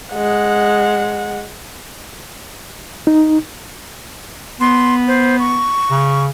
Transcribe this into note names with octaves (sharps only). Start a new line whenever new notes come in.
G#3 F#5
D#4
B3 C6
C5
C#6
C#3